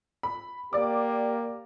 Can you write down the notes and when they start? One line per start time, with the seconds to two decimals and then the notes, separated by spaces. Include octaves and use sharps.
0.23 B5
0.73 A#3 G4 D5 D6